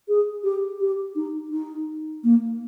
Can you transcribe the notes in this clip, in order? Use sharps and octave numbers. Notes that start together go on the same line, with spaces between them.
G#4
G4
G4
D#4
D#4
A#3